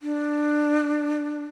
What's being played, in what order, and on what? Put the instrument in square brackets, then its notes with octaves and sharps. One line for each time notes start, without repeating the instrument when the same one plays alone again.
[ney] D4